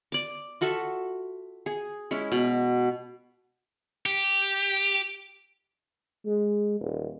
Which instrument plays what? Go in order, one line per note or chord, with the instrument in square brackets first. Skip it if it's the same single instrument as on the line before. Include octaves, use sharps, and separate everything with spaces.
[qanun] D5 D6
F4 F#4 A4 E5
G#4
G#3 C#4 E4
B2
[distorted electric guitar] G4
[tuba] G#3
D#1